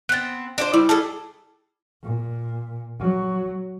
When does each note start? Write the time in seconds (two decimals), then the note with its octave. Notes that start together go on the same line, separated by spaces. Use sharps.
0.09 B3 C4 F#6 A6
0.58 D4 F4 C5
0.73 G3 E4
0.89 G3 G#4 A4 A5
2.03 A#2
3.00 F#3